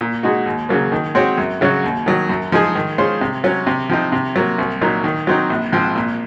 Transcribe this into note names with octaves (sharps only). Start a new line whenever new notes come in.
A#2
G#3 D#4 F#4
D#2
C#3 F#3 A#3
D#3
G#3 C4 F#4 C#5
F#2
C#3 F#3 C#4 F#4
D#2
D#3 F#3
F#2
F3 G#3 D#4 G#4
D#3
G#3 C#4 F4 C5
C3
F#3 C#4
C3
F3 C4 D#4
C3
F#3 A#3
C2
A#2 F#3 A#3 D#4
D#3
F#3 C4 D#4
A#1
G#2 F3 C4
A#2